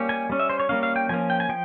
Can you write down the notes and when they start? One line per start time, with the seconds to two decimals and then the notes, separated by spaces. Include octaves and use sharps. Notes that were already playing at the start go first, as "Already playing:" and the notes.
Already playing: G3 A#3 C#4
0.09 G#5
0.29 G3 C#4
0.40 E5
0.49 C5
0.60 C#5
0.69 G3 A#3 C#4 F5
0.83 F5
0.96 G5
1.09 F3 A#3 C#4 G#5
1.30 G5
1.40 G#5
1.49 F3 G5